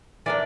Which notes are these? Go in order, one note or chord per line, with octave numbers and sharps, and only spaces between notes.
E3 A#3 D4 D5